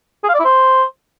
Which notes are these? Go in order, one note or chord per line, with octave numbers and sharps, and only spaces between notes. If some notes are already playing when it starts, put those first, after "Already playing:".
G#4
F5
D5
E4
C5